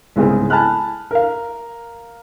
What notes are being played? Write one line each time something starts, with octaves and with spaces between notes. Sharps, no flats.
C2 G#2 C#3 G#3 B3 C4
G#5 A5 B5 F6 F#6
A#4 F5